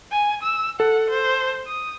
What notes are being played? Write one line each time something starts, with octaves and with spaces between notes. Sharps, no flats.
G#5
E6
A4 F#5
C5
D#6